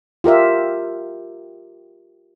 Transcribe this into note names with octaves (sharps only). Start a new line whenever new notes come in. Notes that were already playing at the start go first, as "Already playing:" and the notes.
F4 G4 A#4 E5